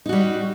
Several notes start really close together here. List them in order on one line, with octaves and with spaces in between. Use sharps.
D#4 F#4 G3